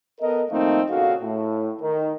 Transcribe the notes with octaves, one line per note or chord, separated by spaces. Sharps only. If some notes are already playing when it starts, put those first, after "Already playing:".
B3 A4 A#4 D#5
D#3 F3 A3 A#3 C4 D#4
A#2 C#3 F#4 A4 F5
A2
D#3